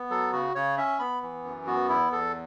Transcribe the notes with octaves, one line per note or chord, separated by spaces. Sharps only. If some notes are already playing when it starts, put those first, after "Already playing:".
Already playing: B3
F#3 A4
C#3 F#4
C#3 C#5
C#4 E5
B3 B5
E3
F#2
B3 F#4
E2 E4
E2 A4